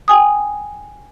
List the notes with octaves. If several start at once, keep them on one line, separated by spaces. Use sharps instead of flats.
G5 G#5 D#6